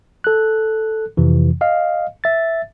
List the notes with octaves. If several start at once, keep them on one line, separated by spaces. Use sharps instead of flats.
A4 F#6
F2 C3 E3
D#5 F5
E5 A6